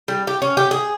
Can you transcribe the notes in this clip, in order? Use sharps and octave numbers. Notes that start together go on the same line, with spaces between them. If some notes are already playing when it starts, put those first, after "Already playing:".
G3
G4
C#4
G4
G#4